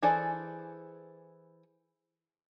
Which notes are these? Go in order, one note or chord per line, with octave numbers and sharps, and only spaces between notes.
E3 G#4 A4 C5 D5